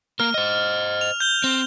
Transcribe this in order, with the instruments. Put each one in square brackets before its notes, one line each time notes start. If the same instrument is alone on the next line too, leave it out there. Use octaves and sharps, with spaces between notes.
[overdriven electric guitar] A#3 A#4 [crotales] F6
[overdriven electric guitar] C5 D#5
[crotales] F7
G6 G7
[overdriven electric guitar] C4